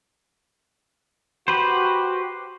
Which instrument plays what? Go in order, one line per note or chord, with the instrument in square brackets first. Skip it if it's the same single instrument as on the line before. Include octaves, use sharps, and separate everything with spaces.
[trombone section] F#4 [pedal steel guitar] G4 B4 C5